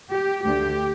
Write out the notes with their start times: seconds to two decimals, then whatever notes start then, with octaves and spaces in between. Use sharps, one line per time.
0.12 G4
0.43 D2 D3 A3 G4